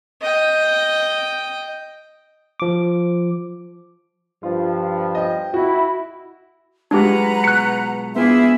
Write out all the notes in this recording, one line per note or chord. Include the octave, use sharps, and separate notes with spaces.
D#5 G5
F3 D6
G2 F3 F4
D#5 G5
E4 F#4
F#3 G#3 D4 F4 G4 B4 F#5 A#5
B2 F#6 C#7
B3 D4 E4 F4 G#4 C5 E5